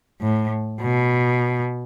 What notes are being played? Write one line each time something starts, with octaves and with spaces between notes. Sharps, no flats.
A2
B2